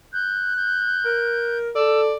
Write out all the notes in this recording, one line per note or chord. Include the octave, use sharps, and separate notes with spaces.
F#6 G6
G6
A#4
A4 D5 E6